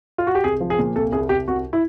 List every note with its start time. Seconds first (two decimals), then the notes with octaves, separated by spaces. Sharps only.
0.18 F4
0.27 F#4
0.35 G4
0.44 C2 G#4
0.61 F3
0.70 G#4
0.79 A#2
0.96 C2 A4
1.12 C2 G#4
1.29 C2 G4
1.48 C2 F#4
1.73 E4